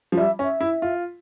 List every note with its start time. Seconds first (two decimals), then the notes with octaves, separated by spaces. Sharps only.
0.12 F3
0.17 G3 E5
0.39 C#4
0.44 E5
0.61 E4
0.82 F4